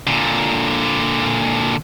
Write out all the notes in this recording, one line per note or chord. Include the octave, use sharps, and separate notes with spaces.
A#2 D3